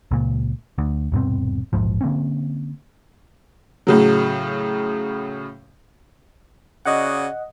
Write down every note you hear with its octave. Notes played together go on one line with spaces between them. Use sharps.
C#2 A#2
D2
D#1 G2 B2 C4
E1 A#1 G#2 F3
D3 A#3 C4 C#4
A2 C#3 F#3
C#3 F#4 D5 D#5 F#5